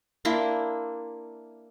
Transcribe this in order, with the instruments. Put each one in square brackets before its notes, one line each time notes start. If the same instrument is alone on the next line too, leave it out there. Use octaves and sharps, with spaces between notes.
[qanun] A#3 D4 E4 C6